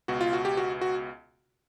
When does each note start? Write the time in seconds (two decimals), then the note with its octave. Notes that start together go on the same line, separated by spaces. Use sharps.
0.08 C#2 B2 F#4
0.21 F4
0.33 F#4
0.45 G4
0.57 F#4
0.81 F#4